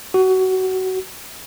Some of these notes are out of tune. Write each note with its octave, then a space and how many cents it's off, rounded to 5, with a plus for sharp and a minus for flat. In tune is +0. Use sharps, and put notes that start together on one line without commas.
F#4 +20